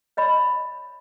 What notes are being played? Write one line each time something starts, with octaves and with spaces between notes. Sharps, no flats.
C#5 D#5 B5